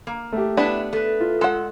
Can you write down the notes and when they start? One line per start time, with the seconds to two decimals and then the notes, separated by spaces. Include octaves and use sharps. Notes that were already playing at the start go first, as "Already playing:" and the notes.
0.07 A#3
0.33 A3 G4
0.57 B3 D4 E4 E5 A5
0.93 A3 B4
1.20 F4
1.41 G#3 A4 F#5